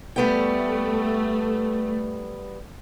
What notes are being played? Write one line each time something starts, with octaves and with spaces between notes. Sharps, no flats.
G3 A3 B3 G5